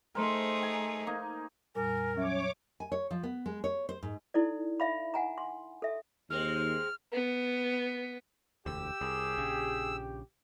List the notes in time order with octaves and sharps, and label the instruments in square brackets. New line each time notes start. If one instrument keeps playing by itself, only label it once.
[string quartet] A3 D#4 G#4 [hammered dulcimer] A#4 C5
[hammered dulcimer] G#5
A#3 D#4
[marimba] F2 A#2 G3 [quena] A#4 [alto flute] G#5
[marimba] F#3 E5 [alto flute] C#4 [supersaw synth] C#5 D6
[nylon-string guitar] G#5
C#5
F3
B3
G#3
C#5
C5
G#2
[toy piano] D#4 E4 A4 D5
E5 F5 B5
F#5 G#5 A#5
C6
A4 E5
[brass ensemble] D#2 [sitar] G#3 C4 [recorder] F6
[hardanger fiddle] B3
[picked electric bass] E1 D2 [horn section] G4 [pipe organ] E6
[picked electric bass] C2 [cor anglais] G#4
[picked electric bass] A#1 C#3